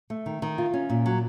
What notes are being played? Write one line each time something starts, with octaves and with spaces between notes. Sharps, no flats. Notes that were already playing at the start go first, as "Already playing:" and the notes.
A3
D#3
D#3
F4
C#4
A#2
F#3